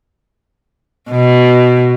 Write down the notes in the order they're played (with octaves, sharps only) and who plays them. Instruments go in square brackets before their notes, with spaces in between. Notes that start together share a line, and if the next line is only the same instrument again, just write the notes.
[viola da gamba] B2